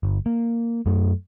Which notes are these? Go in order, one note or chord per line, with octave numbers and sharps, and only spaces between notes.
G1
A#3
F#2 A3